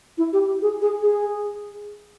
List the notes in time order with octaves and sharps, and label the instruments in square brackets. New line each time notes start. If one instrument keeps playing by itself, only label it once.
[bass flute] E4
G4
G#4
G#4
G#4